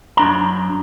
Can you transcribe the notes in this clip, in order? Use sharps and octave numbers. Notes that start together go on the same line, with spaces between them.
F#2 D4 A#5